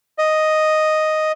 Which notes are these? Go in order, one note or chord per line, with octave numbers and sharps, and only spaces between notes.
D#5